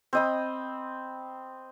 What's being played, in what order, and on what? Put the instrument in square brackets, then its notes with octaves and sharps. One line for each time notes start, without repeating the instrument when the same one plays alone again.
[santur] C4 D#5 B5